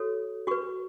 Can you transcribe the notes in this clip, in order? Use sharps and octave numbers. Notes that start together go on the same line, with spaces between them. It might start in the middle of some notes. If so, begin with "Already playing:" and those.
Already playing: F#4 A4 C#5
F#4 B4 C#6